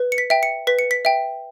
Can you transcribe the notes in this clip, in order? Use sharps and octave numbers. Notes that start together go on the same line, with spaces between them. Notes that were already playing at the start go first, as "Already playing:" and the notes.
Already playing: B4
C#7
B6
E5 G5
C#7
B4 B6
C#7
B6
E5 G5